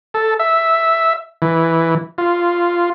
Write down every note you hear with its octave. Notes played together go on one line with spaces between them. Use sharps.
A4
E5
E3
F4